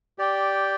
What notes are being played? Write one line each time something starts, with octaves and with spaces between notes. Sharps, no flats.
G4 D5 G5